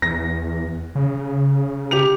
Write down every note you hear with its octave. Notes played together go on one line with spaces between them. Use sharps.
E2 A#6
C#3
G4 F7